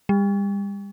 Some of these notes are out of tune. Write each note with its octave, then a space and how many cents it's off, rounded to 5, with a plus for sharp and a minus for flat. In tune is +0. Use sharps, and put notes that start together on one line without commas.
G3 +35